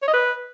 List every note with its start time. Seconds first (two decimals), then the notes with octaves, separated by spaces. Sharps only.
0.02 C#5
0.08 D#5
0.14 B4